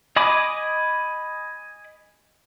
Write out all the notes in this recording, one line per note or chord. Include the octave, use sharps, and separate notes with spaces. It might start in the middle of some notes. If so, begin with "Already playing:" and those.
D#5 G#5 B5 D6 D#6